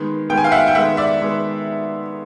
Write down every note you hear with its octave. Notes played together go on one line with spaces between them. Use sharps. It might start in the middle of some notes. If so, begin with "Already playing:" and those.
Already playing: D#3 G#3 B3
D#3 G#3 B3 G5
G#5
F5 G5
E5 F#5
G5
D#3 G#3 B3 E5 F#5
D5 E5
D#3 G#3 B3